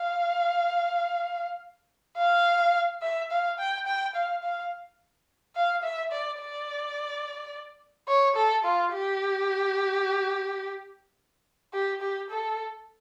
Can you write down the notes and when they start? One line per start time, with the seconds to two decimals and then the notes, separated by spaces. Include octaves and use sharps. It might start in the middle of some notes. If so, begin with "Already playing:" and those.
Already playing: F5
2.18 F5
3.03 E5
3.31 F5
3.58 G5
3.87 G5
4.15 F5
4.43 F5
5.56 F5
5.83 E5
6.11 D5
6.40 D5
8.08 C#5
8.36 A4
8.64 F4
8.92 G4
11.73 G4
12.01 G4
12.30 A4